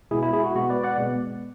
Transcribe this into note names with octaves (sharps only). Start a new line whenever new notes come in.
B2 G#3 B3 E4 G#4
E4
E4 G#4
F#4
B2 G#3 B3 F#4
B4 D5
D5 F#5
B2 G#3 B3